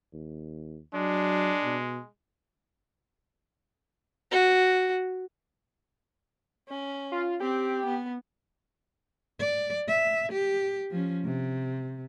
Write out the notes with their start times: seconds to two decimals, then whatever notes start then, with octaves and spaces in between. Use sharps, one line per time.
0.13 D#2
0.94 F#3 G#3 D4
1.63 B2
4.32 F#4
6.68 C#4
7.12 F4
7.40 C4 G4
7.86 B3
9.40 D5
9.88 E5
10.32 G4
10.91 F3 C#4
11.25 C3